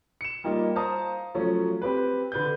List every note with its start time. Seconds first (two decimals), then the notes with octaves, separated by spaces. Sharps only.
0.21 C#7 E7
0.44 G3 A#3 D#4 F4
0.75 C5 F5 A5 A#5 D#6
1.34 F3 F#3 A3 C#4
1.82 C4 G4 B4
2.32 D3 B4 G6